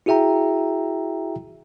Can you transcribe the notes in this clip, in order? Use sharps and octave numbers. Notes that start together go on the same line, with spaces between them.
E4 F#4 G#4 E5 G5 A#5